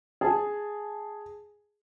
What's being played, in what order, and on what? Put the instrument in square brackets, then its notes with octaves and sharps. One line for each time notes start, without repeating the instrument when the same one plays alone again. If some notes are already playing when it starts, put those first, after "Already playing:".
[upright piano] G#4 A5